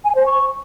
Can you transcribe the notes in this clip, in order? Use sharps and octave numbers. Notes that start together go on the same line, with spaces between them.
G#5
C5
C#6